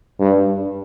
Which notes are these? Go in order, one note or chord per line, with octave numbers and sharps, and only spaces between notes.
G2